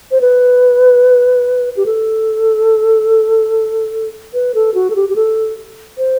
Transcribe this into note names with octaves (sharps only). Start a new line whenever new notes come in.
C5
B4
G4
A4
B4
A4
F#4
A4
G4
G4
A4
C5